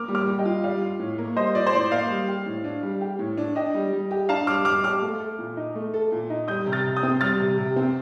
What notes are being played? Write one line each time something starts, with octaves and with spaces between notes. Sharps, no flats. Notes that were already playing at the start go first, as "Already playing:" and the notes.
Already playing: A#3 D6 F6
G3
D6 F6
G3
D#5 G5
F4
G3 D5 F5
F4
A2
A#3
G3 C5 D#5
F4 D5
C5
A2 D5
A#3 D5 F5
G3
G4
A2
D4
G3
G4
A2
D4
D4 D#5 G5
G3
G3
G4
D4 F5 A5
G3 D6 F6
G3 D6 F6
G4 D6 F6
A3
A4
A#2
D#4
A3
A4
A#2
D#4
G3 D#6 G6
C3
F6 A6
C3
D#6 G6
C4
G3 F6 A6
C3
C3
C4